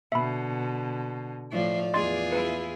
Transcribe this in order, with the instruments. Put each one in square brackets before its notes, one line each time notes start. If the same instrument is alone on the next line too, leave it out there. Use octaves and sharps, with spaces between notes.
[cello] B2 D3 [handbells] E5 B5
[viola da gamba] A2 F3 [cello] D5
[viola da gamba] E2 F4 G#4 [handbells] D#5 C6 A6
[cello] E4 [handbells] B4